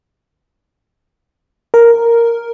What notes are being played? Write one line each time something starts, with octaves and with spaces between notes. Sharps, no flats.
A#4